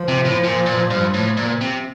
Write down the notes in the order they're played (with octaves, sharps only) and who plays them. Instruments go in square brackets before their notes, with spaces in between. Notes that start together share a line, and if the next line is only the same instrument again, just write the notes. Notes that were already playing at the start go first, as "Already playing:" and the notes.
Already playing: [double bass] F3
[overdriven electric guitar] C3
A2
A#2
A#2
G2
A2
A#2
C3